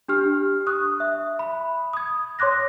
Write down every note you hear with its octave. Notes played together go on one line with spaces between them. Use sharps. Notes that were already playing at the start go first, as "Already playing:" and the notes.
D4 G4 F6
C#6 D#6 F#6
E5
B5
D#6 G#6
C#5 C6 D6 F#6 A#6